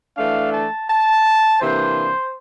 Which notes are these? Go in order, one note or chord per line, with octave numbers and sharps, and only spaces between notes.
E3 A3 D4 F5
A5
A5
C3 E3 A#3 D4 C5